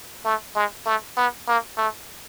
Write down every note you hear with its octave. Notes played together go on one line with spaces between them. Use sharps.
A3
G#3
A3
B3
A#3
A3